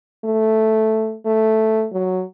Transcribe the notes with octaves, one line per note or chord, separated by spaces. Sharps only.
A3
A3
F#3